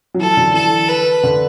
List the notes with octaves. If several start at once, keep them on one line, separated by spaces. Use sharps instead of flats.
F#3
E3 A4
D3
E3 A4
B4
D3